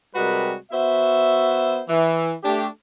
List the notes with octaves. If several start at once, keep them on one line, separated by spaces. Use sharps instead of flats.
C3 G3 G#3 F#4 A#4 B4
B3 F#4 C5 E5
E3
A3 D4 G4